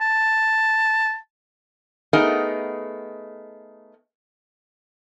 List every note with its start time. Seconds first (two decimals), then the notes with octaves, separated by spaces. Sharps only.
0.01 A5
2.13 A3 B3 D#4 G#4 A#4 D#5